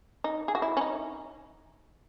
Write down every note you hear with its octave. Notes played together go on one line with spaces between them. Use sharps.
D#4
G#4
F#4
E4
C#4
D#4